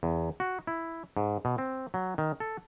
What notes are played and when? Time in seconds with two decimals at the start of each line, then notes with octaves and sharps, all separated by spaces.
0.03 E2
0.40 F#4
0.67 E4
1.17 G#2
1.45 B2
1.58 C4
1.94 F#3
2.18 D#3
2.40 A4